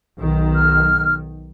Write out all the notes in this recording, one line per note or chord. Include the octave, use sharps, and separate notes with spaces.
B1 D#3
F6